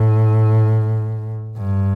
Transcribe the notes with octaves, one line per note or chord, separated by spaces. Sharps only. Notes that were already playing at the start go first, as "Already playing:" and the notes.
Already playing: A2
G2